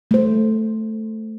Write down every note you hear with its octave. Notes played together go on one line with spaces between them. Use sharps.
A3 C5